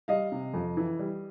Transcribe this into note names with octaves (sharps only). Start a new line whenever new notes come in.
G3 D#5 F5
C3
F2
E3
G3